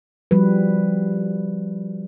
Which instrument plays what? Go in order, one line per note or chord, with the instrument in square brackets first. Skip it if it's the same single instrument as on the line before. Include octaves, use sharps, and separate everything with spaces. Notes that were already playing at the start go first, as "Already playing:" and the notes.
[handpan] F3 G3 F#4 B4